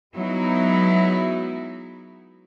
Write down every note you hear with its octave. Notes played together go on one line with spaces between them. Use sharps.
F#3 G#3 B3 D#4 E4 F#4